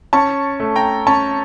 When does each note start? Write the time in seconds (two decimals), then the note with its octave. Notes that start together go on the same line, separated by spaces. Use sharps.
0.13 C#4 A5 C#6
0.60 A3
0.76 G5 A#5
1.07 C#4 A5 C#6